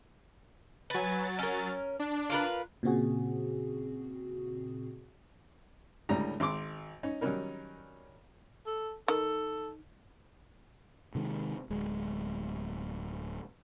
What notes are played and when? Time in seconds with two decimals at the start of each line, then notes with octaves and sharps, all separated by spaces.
0.90 F#3 B4 G#5 A6
1.39 C#4 A#4
1.99 D4
2.30 F4 A#4 B4
2.83 A#2 C#3 C4 F#4 G#4
6.09 C#2 A2 D3 G3 D4 A#5
6.40 G#1 C6 D6
7.03 C#4 D#4
7.21 D#3 F#3 G3 C#4 D#4 A#4
8.67 A4
9.08 D#3 A4
11.15 C3 D#3 G#3
11.70 D1 G#3